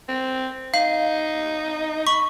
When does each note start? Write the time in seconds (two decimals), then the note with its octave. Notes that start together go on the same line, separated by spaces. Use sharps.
0.09 C4
0.74 D#4 F5
2.07 B5 C#6